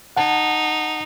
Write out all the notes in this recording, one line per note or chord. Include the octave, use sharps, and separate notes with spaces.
D#4 F#5 A5